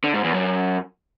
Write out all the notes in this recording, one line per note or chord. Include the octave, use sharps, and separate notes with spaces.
D3
G#2
E2
F#2